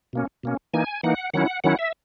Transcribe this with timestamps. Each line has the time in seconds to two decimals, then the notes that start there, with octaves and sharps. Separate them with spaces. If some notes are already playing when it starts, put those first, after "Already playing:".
0.13 B2 A#3 C#4
0.43 B2 A#3 C#4
0.74 E3 A#3 D#4 G#5
1.03 E3 A#3 D#4 F#5
1.34 D#3 F#3 C#4 E4 F#5
1.64 D#3 F#3 C#4 E4 F#5
1.79 E5